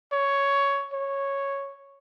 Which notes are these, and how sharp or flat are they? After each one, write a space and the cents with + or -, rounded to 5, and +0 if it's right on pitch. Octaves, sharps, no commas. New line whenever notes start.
C#5 +10
C#5 -5